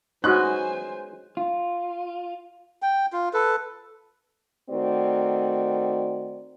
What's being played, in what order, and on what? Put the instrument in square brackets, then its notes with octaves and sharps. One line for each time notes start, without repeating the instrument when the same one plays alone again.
[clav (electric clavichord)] G#3 B3 C#4 [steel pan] D#4 F#4 [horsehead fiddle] C5 G#5 [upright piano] F#6
[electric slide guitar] F4
[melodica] G5
F4
A4 B4
[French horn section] D#3 A3 C4 F#4 D5